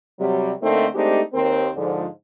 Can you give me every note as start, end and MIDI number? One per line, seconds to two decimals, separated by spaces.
0.19 0.51 48
0.19 0.51 54
0.19 0.51 55
0.62 0.87 50
0.62 0.87 57
0.62 0.87 58
0.62 0.87 60
0.62 0.87 62
0.62 0.87 63
0.95 1.20 56
0.95 1.20 57
0.95 1.20 60
0.95 1.20 62
0.95 1.20 63
0.95 1.20 67
1.33 1.68 39
1.33 1.68 60
1.33 1.68 70
1.76 2.05 44
1.76 2.05 50
1.76 2.05 53